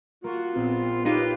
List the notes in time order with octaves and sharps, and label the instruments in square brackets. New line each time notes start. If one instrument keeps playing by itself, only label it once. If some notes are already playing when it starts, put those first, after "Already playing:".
[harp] A#3 [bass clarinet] F4 [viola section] F#4
[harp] A#1 [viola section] B3 C4
[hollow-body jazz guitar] D#4 [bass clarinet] F4 [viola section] G4 B4 [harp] C#5 F5